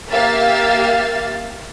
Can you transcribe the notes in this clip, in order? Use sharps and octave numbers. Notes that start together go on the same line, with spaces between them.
A#3 G4 E5 F5 A6